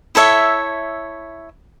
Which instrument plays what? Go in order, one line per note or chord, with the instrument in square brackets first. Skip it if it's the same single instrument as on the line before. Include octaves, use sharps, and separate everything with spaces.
[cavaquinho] E4 A4 C#5 E5